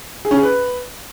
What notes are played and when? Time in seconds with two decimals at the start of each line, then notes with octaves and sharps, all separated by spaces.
0.25 G#4
0.31 C#4
0.37 G#4
0.43 B4